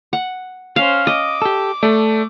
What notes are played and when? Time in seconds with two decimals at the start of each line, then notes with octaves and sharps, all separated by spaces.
0.13 F#5
0.76 C#4 C5 F5
1.07 D#5 D6
1.42 G4 A4
1.83 A3 A4 D5